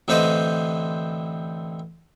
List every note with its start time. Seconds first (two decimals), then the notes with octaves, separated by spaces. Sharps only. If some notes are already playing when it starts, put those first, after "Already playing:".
0.08 A1 D3 C4 B4 C5 D#5